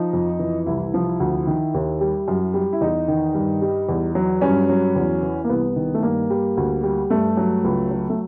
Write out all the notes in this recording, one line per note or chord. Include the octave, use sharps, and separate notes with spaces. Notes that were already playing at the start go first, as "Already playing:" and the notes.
Already playing: F3 D#4
F2
E3
C2 E4
F3
D2
D#3
D#2
G3
F#2
G3
E4
E2 D#4
D#3
G2
G3
E2
F#3
G2 C#4
F#3
E2
E3
A#3
C2 B3
D#3
A3
G2 A#3
G3
D2
G3
G2 A3
F#3
C#2
F#3
A3